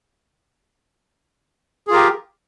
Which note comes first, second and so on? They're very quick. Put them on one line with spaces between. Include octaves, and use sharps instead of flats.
G#4 F4 A#4 G4